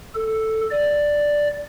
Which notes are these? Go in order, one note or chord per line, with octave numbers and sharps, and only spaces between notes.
A4
D5